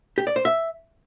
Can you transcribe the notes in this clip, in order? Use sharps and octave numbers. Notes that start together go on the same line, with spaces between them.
G4
D5
C5
E5